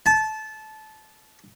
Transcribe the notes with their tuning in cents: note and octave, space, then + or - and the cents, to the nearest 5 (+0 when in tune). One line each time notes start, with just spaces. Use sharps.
A5 -20